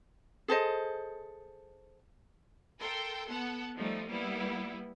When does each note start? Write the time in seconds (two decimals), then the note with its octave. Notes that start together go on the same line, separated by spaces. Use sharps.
0.48 G#4 A4 C5 D#5
2.79 A4 A#4 G5 C6
3.30 B3 A4 F#5
3.77 F3 G3 A3 D#4
4.08 G3 A#3 B3 E4